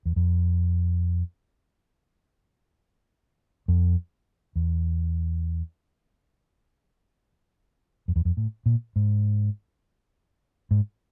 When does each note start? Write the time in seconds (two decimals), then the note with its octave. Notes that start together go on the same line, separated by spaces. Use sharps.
0.05 E2
0.16 F2
3.68 F2
4.56 E2
8.08 F2
8.16 E2
8.25 F2
8.37 A2
8.66 A#2
8.96 G#2
10.71 G#2